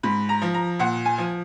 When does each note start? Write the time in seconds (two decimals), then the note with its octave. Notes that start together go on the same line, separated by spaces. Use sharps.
0.03 G#2 B5
0.29 A#5
0.42 F3
0.54 A#5
0.79 A#2 F#5
1.06 G#5
1.18 F3